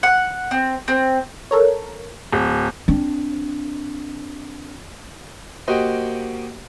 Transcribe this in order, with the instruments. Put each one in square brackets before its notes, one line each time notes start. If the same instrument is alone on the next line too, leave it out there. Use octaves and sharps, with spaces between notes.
[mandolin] F#5
C4
C4
[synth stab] A4 A#4 C#5
[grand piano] D1
[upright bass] C4 D4
[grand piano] A#3 F#4 G4 C5 D#5 G5